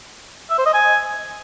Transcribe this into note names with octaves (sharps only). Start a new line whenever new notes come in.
E5
C5
D#5
G#5